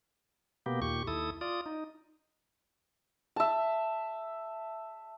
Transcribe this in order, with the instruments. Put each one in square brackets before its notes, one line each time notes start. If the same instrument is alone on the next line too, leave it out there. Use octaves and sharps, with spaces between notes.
[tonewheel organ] B2 A#3 B3 G4
D#2 A#2 G4 C#6
D#2 E4 A4 D#6
F4 D5 D#6
D#4
[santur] E5 A5